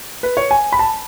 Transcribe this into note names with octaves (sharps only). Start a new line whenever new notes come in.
B4
C#5
G#5
B5
A5